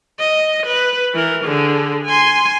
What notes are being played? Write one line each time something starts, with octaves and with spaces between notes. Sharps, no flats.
D#5
B4
E3 A#4
D3 G#4
G#5 C6